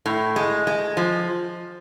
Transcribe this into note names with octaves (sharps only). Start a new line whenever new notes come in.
A2
G#3
G#3
F3